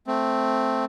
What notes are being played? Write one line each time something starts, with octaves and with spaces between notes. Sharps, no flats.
A3 C4